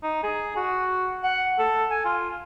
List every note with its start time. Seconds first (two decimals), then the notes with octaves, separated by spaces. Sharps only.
0.03 D#4
0.23 G#4
0.57 F#4
1.24 F#5
1.59 A4
1.90 G#5
2.05 F4